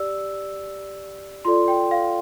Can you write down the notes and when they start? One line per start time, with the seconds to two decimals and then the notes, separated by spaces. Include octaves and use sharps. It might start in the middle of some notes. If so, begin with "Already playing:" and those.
Already playing: G4 D5 E6
1.45 F4 A4 D5 C6
1.68 G5
1.91 F5